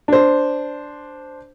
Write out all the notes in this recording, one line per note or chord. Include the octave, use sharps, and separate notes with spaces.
D4 C5